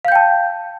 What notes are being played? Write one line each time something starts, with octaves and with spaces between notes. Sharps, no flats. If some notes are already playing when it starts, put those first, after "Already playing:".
F5 G5 A5 G6